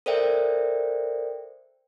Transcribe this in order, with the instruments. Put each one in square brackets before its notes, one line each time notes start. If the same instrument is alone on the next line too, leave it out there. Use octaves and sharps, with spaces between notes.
[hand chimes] A4 A#4 C5 D5 E5 G5